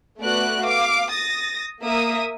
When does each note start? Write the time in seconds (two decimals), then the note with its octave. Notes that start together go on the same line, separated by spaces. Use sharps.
0.19 A3 B3 F#4 D5 F#6
0.63 F5 D6
1.11 D#6 A6 A#6
1.81 A#3 E5 D#6